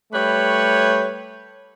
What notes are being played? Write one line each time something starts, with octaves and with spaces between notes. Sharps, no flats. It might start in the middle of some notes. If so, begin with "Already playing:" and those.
G3 A3 B4 C#5